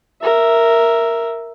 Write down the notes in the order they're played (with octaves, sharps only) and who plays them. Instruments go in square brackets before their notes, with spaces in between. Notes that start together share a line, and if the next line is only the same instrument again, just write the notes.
[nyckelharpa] A#4 E5